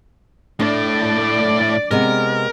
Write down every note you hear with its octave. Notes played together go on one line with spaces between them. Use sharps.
A2 A3 D4 D5
C3 G#3 B3 A#4